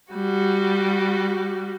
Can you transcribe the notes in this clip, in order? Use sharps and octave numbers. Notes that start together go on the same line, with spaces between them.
G3 F#4